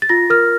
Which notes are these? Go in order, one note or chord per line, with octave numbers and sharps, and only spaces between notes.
A6
F4 A#6
A#4 F6